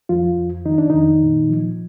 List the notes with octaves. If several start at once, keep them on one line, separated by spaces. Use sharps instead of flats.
F2 F3 F4
F2
D#3 D#4
D4
F2 D#3 D#4
A#2
F3